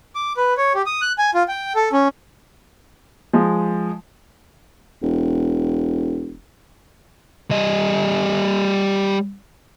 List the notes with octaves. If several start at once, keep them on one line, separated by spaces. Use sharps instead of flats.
D6
B4
C#5
G4
D#6
F#6
G#5
F4
G5
A4
C#4
F3 G#3
E1
G3 D#5